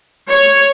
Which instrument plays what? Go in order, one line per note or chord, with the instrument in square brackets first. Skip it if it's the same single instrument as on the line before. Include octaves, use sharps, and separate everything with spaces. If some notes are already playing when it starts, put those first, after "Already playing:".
[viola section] C#5